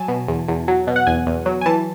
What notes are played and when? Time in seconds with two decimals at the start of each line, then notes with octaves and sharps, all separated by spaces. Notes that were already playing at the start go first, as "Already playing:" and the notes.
Already playing: F#3 G#5 A5
0.08 B2
0.28 E2
0.48 E2
0.68 F#3
0.87 B2
0.96 F#5
1.07 E2 G#5
1.26 E2
1.46 F#3
1.61 G#5
1.66 E3 A5